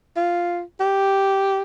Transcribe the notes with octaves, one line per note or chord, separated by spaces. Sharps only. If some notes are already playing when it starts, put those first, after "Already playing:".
F4
G4